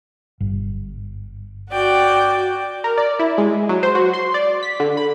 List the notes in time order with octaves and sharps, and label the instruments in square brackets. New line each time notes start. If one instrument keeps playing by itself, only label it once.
[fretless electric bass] G1
[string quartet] F#4 D5 G5
[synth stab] A#4
D5
E4
G#3
F#3
C5
F#4
C6
D5
B6
D3
B5